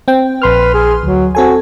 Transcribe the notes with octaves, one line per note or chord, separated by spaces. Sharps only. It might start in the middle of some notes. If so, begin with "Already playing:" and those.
C4 G5
A#1 B4 C6 F6
G#4
D2 F#3
C4 F#4 A4 G#5